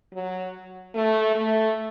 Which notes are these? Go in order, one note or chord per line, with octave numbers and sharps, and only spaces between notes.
F#3
A3
A3